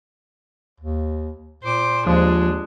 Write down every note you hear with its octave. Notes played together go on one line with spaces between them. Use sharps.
D#2
A#2 C5 D6
D#2 F3 G#3 D4